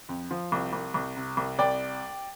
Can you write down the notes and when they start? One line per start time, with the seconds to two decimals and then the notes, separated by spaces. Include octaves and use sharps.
0.09 F2
0.31 F3
0.52 C2
0.73 C2
0.94 C2
1.16 C3
1.37 C2
1.59 C2 D5 G5